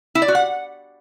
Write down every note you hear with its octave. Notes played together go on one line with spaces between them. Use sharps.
E4
D5
F#4
F#5